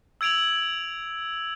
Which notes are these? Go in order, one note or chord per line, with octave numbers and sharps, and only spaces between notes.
E6 G#6 D7 F7 F#7